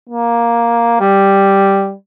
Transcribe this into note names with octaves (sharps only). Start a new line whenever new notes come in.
A#3
G3